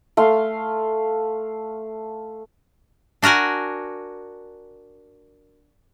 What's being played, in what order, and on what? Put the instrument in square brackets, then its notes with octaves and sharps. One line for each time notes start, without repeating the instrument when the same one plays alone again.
[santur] A3 F5 C6
[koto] D4 F#4 A#4 F#5 G#5